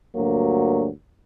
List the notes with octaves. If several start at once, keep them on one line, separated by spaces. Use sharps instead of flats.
D2 G2 F#3 A#3